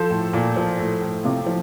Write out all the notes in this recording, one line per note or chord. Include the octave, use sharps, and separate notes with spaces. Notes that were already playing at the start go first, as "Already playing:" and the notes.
Already playing: F3 A4 C5
A2
A#2
F3
A2
A2
C3 F4
F3